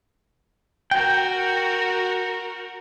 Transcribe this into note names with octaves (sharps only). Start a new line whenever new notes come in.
F#4 A#4 G5